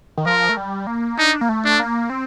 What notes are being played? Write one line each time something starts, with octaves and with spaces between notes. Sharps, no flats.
D#3
F3 A#4
A3
G3
A#3
D4 D#4
A#3
A3
D4
A#3
C4